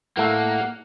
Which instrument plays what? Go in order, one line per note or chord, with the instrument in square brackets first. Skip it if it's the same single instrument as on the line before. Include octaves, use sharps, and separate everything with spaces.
[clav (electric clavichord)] A2 A3 [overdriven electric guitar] A#3 [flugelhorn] F#5